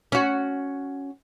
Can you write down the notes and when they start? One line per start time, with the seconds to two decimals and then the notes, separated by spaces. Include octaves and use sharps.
0.12 C#4 F#4